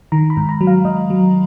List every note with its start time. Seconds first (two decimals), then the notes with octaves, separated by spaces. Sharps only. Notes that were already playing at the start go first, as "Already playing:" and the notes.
0.12 D#3 A#5
0.30 B5
0.37 G#2
0.49 A#5
0.61 F#3
0.67 F5
0.85 G#2 D#5
1.10 F#3